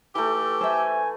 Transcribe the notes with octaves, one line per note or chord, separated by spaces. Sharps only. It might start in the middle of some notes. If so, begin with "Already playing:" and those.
E3 A3 G4
C5 E5 G#5